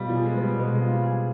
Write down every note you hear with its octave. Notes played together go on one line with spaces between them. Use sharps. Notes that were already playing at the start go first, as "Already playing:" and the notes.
Already playing: B2 G3 B3 F4
F3
G#4
G#3
B3
G3
B2 G#3
G#3
F4
G3
G#4